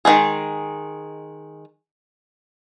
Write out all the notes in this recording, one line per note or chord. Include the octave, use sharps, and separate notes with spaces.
D#3 E3 G#3 G#4